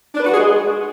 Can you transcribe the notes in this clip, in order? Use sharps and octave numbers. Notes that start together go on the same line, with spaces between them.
D4
B4
F#4
G#4
G#3